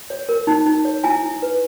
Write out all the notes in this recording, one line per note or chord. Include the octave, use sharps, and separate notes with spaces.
C#5
A#4
D#4
D#4
C#5
E4 G#5
E4
B4